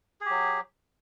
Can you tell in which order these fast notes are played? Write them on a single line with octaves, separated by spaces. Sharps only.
G#4 G4 F#3